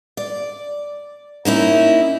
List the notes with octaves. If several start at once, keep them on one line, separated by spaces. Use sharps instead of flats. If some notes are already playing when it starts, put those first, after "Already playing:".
D5
A#3 C#4 D#4 E4